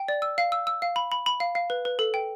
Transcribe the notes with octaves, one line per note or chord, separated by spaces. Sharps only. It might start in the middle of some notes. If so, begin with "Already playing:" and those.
Already playing: G5
D5
E6
F5
E6
E6
F5
B5
B5
B5
F5
F5
B4
B4
A4
G5